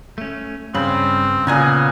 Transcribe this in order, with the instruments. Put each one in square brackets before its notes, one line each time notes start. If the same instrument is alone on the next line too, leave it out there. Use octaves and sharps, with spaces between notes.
[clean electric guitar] A3 C#4
[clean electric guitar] G2 B5 [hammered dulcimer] C#3 [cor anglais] C4
[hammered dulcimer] A#2 G#5 A#5 [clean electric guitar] C#3 [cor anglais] B3